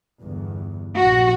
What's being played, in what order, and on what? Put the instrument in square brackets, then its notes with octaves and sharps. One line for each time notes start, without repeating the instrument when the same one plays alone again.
[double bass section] G1 E2
[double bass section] A#1 [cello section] F#4